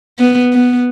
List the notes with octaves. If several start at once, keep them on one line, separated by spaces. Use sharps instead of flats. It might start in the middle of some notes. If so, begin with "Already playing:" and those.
B3
B3